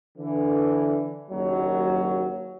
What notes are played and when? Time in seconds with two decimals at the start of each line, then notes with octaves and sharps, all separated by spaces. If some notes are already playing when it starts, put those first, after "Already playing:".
0.18 D3 E3
1.31 F#1 D#2 F#3